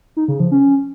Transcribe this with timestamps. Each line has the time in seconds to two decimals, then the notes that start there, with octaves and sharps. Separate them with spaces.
0.17 D#4
0.28 C#3
0.40 F3
0.52 C#4